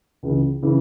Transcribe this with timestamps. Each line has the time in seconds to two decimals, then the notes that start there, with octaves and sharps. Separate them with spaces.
0.23 C#2 C#3 E3
0.62 C#3 E3